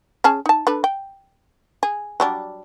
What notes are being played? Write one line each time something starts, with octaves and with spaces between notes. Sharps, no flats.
C#4 G#4 A5
D#4 A5
D4 A4 B4
G5
G#4
F#3 G3 D4